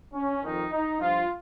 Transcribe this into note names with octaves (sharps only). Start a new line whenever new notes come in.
C#4
F2 D#3 D#4
D#4
G2 F3 F4